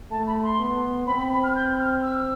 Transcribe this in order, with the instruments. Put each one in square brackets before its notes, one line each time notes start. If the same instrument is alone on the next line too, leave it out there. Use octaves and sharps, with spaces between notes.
[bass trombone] A3 [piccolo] A5
[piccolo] B5
C6
[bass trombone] B3
[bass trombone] C4 [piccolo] B5
[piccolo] B5
B5
F6
G6
F6
E6